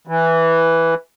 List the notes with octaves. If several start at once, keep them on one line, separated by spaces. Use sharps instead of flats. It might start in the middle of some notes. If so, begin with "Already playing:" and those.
E3